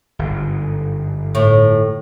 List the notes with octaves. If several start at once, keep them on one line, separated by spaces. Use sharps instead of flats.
G1 G#2
A2